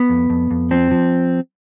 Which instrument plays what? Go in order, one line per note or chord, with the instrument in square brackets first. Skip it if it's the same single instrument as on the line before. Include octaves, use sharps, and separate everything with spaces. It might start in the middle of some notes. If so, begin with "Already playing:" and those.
Already playing: [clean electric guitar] B3
F2
F2
F2
F3 C4
F3